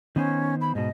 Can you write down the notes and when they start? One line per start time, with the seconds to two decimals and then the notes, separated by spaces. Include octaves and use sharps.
0.16 D#3 B3 C#4 C5
0.61 B5
0.75 G#2 B2 D#5